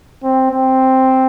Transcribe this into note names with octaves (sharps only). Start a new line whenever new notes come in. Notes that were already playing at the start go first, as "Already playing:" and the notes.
C4
C4